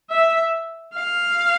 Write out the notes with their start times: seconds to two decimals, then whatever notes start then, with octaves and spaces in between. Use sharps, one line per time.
0.10 E5
0.95 F5